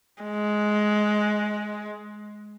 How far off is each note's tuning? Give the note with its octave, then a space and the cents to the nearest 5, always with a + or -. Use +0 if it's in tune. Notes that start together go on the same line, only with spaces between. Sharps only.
G#3 +15